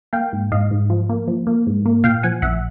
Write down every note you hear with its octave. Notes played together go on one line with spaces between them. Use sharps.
A#3 F5 G5
G#2
G#2 D#5 F5
G#2
F3
A#3
F3
A#3
G#2
A#3
A#2 F5 G5
F3 F#5 G#5
A#1 E5 F#5